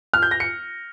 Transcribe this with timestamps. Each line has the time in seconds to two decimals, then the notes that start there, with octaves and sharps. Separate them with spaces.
0.14 F6
0.22 G6
0.31 A#6
0.40 C#7